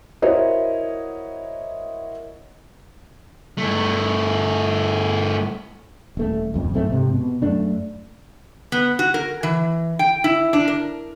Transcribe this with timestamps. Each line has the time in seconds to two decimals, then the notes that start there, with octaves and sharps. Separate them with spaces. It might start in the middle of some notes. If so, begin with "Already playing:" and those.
0.22 E4 F#4 A#4 C5 C#5 D#5
3.58 G2 A3
6.17 D#1 A3
6.54 D#1 F2
6.74 B1 G#2 A3 C4
6.90 G#2 C3
7.14 B2
7.42 F#2 A3 D4
8.72 B3
8.99 F#4
9.14 A#4
9.43 E3
9.99 G5
10.24 E4
10.53 D4
10.68 A#4